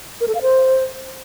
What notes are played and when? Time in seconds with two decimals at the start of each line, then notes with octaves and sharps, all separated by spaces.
0.21 A#4
0.28 A4
0.35 F5
0.42 C5